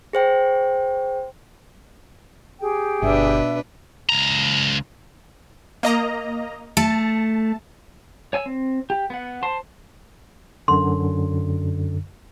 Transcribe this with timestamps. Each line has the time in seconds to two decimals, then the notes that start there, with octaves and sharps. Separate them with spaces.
0.13 G#4 C5 G5
2.60 G4 G#4 G5
3.03 G1 B2 D4 B4 E5
4.09 C#2 A#5
5.83 A#3 D#5 A#5
6.77 A3 A5
8.33 C#5 G#5 E6
8.46 C4
8.90 G4
9.10 B3 F#5
9.43 C5 A5 C6
10.68 F#2 D3 C6